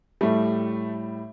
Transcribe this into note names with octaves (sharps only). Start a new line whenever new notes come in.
A2 G3 A3